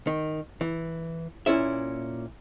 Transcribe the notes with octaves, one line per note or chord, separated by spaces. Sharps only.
D#3
E3
A#2 C#4 E4 E5